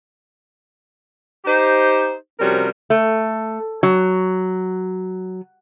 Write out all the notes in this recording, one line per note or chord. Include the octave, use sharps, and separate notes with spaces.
D#4 G4 C5
C3 F3 G3 C#4 F#4 A#4
A3
F#3